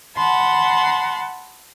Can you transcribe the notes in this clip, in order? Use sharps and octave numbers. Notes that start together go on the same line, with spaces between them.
F#5 A5 B5 C6